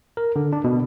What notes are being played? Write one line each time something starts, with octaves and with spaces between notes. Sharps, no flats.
A#4
D3
D4
B2